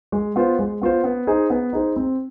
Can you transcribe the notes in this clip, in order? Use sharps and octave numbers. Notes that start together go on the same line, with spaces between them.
G#3
B3 F4 C5
G#3
B3 F4 C5
B3
D#4 G#4 C5
B3
D#4 G#4 C5
C4